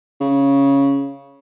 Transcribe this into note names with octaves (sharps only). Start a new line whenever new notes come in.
C#3